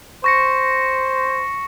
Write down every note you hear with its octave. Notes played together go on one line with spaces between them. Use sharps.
C5 C#6 A#6 C#7